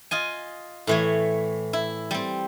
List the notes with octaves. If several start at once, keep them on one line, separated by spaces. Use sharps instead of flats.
F4 D#5 G#5
A2 E3 C#5
E4
G3 C4